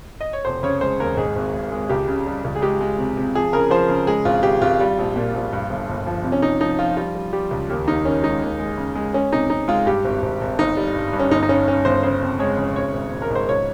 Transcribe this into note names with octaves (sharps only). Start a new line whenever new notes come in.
D#5
C#5
F1 C5
C#3 C#5
G#3 C5
D#2 A#4
G#2 G#4
G#1
G#1
G#3
C#2 G4
C#3
G3
C#2
G#4
G#3 G4
G#3
C3
C3
F3 G#4
C#3 A#4
F3 C5
C#3
G#3 G#4
G#1 F4
G#1 G4
G#1 F4
G3
A#1
A#2
A#1
G2
G1
G1
F3
C3
C#4
C3 D#4
F3 D#4
F3 F4
G3 F4
G3
G3 G4
C#2
D#2 G4
D#2 D#4
D#3 C#4
G#3 D#4
D#2
G#3
C#3
G#3
G#3 C#4
C3 D#4
C3 D#4
G#3 F4
G2 G4
G#1
G#1
G#1
G1 D#4
G3
G2
G2
C#4
G1 D#4
D#4
G2 C#4
G2 C#4
G1 C5
C#3 C5
F2
G#3 C#5
C#3
G#1 C#5
G#1
G#1
A#4
G#2
C5
C#2 C#5